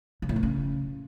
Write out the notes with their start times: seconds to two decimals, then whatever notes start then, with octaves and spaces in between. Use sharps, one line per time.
0.22 C#3
0.29 A2
0.36 B2
0.43 C#3